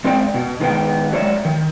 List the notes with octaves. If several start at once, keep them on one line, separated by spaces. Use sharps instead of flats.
G#3 C4 D5 G5
B2
D#3 G#3 B3 G5
F#3 G#3 C#5 D5 E5
D#3